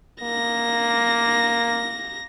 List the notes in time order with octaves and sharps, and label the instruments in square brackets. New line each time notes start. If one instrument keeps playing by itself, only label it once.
[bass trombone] A#3 [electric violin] A#6